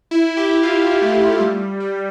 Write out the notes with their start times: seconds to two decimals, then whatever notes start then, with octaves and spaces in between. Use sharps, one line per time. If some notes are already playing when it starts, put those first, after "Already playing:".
0.11 E4
0.37 G4
0.63 F4
1.02 A3
1.40 G3
1.80 G3